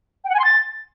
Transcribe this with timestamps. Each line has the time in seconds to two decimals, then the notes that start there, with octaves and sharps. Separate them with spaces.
0.24 G5
0.29 F#5
0.34 G#5
0.39 C6
0.44 A6